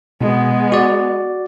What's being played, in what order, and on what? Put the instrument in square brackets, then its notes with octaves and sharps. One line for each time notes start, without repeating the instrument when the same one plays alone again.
[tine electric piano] B2 [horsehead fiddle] G#3 B3
[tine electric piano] F#4 D5